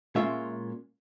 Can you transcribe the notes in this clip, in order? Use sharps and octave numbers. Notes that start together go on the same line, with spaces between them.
A#2 G#3 C#4 F4 E5